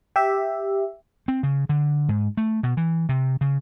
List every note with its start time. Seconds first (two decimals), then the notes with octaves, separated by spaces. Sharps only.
0.16 G4 E5
1.28 C4
1.43 C#3
1.69 D3
2.09 G#2
2.37 A3
2.63 B2
2.77 E3
3.09 C3
3.41 C#3